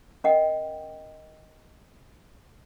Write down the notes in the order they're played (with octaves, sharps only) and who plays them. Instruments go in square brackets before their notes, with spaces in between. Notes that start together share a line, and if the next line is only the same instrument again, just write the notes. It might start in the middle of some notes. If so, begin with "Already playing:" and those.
[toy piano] C#4 A#4 D#5 F#5 G5